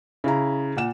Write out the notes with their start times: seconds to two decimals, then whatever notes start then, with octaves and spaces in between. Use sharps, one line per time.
0.24 C#3 E4 A#5
0.76 A#2 F#5 E7